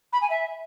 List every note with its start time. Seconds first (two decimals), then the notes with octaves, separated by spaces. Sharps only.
0.12 B5
0.21 G#5
0.30 E5